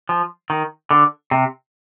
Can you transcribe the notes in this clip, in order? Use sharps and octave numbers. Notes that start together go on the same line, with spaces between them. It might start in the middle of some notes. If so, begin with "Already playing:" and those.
F3
D#3
D3
C3